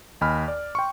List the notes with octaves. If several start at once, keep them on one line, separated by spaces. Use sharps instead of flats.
D#2 D#5 G#5 B5 F6
D5
G5 C6 C#6